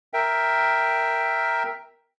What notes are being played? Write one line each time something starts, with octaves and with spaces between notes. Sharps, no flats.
A#4 E5 G5